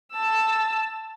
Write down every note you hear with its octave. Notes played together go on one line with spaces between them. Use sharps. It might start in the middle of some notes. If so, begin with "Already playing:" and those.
A5 E6